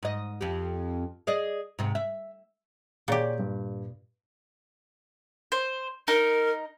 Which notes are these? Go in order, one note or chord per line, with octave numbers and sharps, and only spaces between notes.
G#2 D#5
F2 G4
G#4 D5 D#5
G#2 C3
E5
A#2 G4 G#4 C#5 D5
G2
C5
D#4 A#4